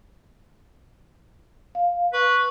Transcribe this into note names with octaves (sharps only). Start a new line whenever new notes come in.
F5
B4 C#6